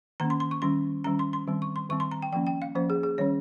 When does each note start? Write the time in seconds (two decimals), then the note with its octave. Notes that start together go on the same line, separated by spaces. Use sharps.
0.20 D#3 A#3 C#4 A#5
0.30 C6
0.40 C6
0.51 C#6
0.62 D#3 G3 C#4 C6
1.04 D#3 G3 C#4 A#5
1.19 C6
1.33 C6
1.47 D#3 G3 C4
1.62 C#6
1.76 C6
1.90 D#3 G3 C4 C#6
2.00 C6
2.11 A#5
2.22 G5
2.33 F3 A#3 C#4 G5
2.47 G5
2.62 F5
2.75 F3 A#3 C#4 C5
2.90 G#4
3.03 G#4
3.18 D#3 G3 C#4 C#5